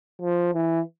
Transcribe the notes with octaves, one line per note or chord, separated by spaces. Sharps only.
F3
E3